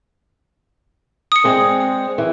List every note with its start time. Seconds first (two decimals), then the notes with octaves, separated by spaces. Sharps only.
1.32 D#6 C#7
1.44 G#3 C4 D4
2.18 E3